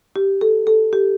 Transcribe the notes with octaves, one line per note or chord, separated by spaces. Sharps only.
G4
A4
A4
G4